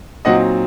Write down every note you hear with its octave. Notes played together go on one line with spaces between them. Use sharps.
A#2 F#3 C4 D#4 D#5 F#5